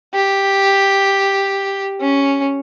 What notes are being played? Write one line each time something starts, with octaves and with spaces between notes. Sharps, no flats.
G4
C#4